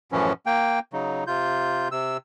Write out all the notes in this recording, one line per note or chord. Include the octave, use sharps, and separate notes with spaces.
F#2 A2 E3 F3 C#4
A#3 G5
C#3 F#3 D#4
C3 F4 G6
C3 E6